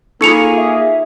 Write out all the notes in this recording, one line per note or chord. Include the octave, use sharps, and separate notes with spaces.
A#3 D#4 F4 G#4 A4 C#6 C#7 F7
E5